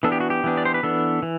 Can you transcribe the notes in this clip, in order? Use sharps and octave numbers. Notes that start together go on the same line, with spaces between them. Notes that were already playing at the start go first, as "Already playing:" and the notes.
E3 B3 D4 A4
G4
F#4
G4
E3 B3 D4
D5
C5
B4
E3 B3 D4 A4
E3